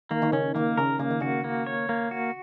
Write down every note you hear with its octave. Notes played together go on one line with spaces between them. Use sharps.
D#3 A#3
D#3
C#3 C#4
D#3 A#3
C#3 A#4
C#3 A#3
D#3
C#3 F#4
A#3
C#5
A#3
F#4